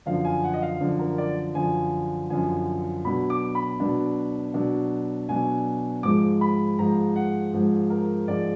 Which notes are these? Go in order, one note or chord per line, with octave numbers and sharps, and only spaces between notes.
F#2 D3 F3 F5
G#5
F#5
D#5
F5
F#2 D3 F3
A#4
D5
F#2 D3 F3 G#5
F#2 D3 F3 G#5
B2 F#3 D4 B5
D6
B5
B2 F#3 D4
B2 F#3 D4
B2 F#3 D4 G#5
G#2 F3 G#3 D6
B5
G#2 F3 G#3 A#5
F#5
G#2 F3 G#3
A#4
G#2 F3 G#3 D5